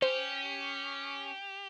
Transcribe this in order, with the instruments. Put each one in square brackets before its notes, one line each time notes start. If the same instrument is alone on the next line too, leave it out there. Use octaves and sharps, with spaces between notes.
[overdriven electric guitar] C#4 [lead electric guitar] G4 [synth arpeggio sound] C5